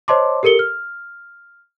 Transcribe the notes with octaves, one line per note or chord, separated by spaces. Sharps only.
C5 C#5 D#5 A5 C6 D6
G4 A4 A#4 C#7 G7
F6